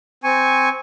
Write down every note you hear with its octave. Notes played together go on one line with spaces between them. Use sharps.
C4 G#5 C#6